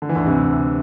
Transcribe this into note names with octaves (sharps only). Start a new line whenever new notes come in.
D3
E3
D2 D3
C3